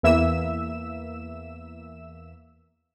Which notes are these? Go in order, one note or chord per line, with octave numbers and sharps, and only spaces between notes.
E2 E3 A#3 E5 E6 E7